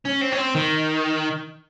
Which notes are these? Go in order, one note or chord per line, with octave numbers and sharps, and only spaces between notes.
C#4
C4
C#4
C4
D#3